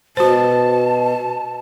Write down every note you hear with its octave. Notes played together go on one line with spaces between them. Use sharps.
B2 F#4 C5 A5